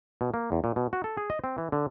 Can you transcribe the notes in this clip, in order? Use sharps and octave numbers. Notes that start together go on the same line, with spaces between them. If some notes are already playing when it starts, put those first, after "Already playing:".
B2
A#3
E2
A#2
B2
F#4
A4
G#4
D#5
C4
E3
D3